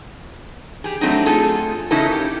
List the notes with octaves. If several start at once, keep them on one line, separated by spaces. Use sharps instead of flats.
G4 G#4
F#3 A3 C4 D4 D#4
A3 F4 G#4 A4
C#3 C#4 D#4 E4 A4 A#4
G4